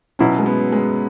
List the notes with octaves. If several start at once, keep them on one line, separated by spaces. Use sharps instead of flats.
B2 F#3 C#4 E4
G#3
B3
G#3